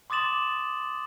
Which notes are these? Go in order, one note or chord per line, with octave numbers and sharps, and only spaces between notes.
C6 D6 D#6 A6 E7 F#7